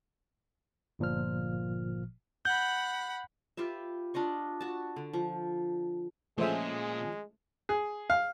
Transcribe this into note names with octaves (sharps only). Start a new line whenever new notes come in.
G1 A#2 F3 F6
F#5 B5 G6
F4 G4 B4 E5
D4 F4 D#5 C#6
F#4 A5
D3
F3
A#2 F3 G#3 A3 C#4 G#4 C5 E5
G#4
F5